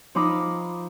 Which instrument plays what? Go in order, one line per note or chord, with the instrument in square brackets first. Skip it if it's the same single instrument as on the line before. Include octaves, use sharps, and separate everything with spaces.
[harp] F3 D#4 F5 B5 D6 D#6